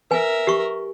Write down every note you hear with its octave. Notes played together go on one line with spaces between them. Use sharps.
A#4 B4 E5 G#5
G4 C#6